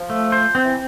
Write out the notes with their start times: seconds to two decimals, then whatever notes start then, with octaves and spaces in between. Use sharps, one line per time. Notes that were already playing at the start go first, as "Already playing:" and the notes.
Already playing: F3
0.10 A3
0.32 C5
0.55 C4
0.65 E3